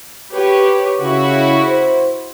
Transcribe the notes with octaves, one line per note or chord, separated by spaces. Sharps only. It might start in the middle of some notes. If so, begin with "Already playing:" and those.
G4 B4 C#5
C#3 E4 F#4
C5